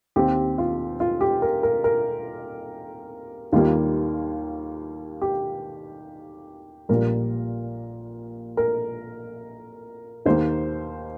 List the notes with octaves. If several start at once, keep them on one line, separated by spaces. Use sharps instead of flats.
D#2 D#3 C4 G4
F4
F4
G4
A#4
A#4
A#4
D#2 D#3 G3 A#3 F4
G4
A#1 A#2 G3 A#4
A#4
D#2 D#3 A#3 C5